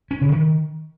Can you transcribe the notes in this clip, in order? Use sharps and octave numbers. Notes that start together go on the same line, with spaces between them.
C#4
C#3
D#3